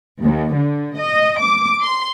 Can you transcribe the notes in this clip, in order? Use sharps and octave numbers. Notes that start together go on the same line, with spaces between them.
D#2
D3
D#5
D6
C6